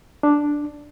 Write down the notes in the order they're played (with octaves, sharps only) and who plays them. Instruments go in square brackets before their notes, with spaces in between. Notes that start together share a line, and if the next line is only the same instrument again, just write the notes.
[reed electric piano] D4